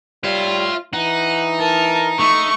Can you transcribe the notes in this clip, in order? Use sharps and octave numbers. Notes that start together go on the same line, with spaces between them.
G3 F4 C#5 E5
E3 D#4 F#5
A#4 A5
A3 D#4 C#6